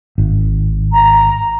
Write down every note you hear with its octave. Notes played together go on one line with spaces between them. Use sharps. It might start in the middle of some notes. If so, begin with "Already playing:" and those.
G#1
A#5